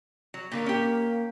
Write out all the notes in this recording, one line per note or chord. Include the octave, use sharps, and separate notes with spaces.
F#3
A#2 D3 A#3 C#5
C#4 G4